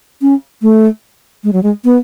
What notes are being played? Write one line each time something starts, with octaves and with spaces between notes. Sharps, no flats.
C#4
A3
G#3
F#3
G#3
B3